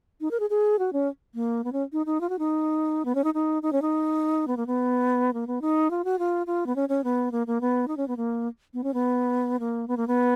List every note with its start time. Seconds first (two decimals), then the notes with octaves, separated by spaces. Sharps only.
0.21 D#4
0.31 A#4
0.40 G#4
0.50 G#4
0.79 F#4
0.93 C#4
1.35 A#3
1.64 B3
1.73 C#4
1.93 D#4
2.06 D#4
2.21 F4
2.29 F#4
2.39 D#4
3.05 B3
3.15 C#4
3.24 D#4
3.34 D#4
3.63 D#4
3.73 C#4
3.82 D#4
4.48 B3
4.57 A#3
4.67 B3
5.34 A#3
5.47 B3
5.62 D#4
5.91 F4
6.05 F#4
6.19 F4
6.47 F4
6.66 B3
6.76 C#4
6.89 C#4
7.04 B3
7.32 A#3
7.47 A#3
7.61 B3
7.88 D#4
7.97 C#4
8.08 B3
8.17 A#3
8.74 B3
8.84 C#4
8.94 B3
9.59 A#3
9.88 B3
9.97 A#3
10.08 B3